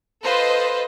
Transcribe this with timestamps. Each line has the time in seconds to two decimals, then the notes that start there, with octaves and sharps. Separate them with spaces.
0.23 F4 A4 B4 C5 D#5